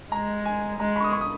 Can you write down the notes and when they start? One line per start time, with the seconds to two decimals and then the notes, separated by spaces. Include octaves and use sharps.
0.12 G#3 A#5
0.45 G#5
0.79 G#3 A#5
0.96 B5
1.00 C#6
1.04 D#6
1.13 C#6
1.21 D#6